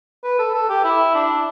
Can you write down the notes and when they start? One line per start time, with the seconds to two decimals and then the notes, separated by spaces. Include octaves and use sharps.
0.24 B4
0.39 A4
0.54 A4
0.69 G4
0.84 E4
1.14 D4